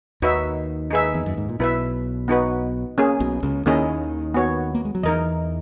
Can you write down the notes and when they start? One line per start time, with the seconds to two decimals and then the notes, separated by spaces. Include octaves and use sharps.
0.22 D#2 D#3 D#4 F#4 B4 E5
0.91 D#4 G#4 B4 E5
1.14 E2
1.26 F#2
1.37 G#2
1.49 A#2
1.59 B1 B2 E4 B4 E5
2.28 B3 D#4 F#4 B4
2.98 A#3 C#4 G#4
3.20 B1 B2
3.43 C#2 C#3
3.66 D#2 D#3 A#3 C#4 E4 G#4 D#5
4.34 B3 F#4 C#5
4.75 A#3
4.85 G#3
4.95 F#3
5.03 E2 E3 D#4 A#4 D#5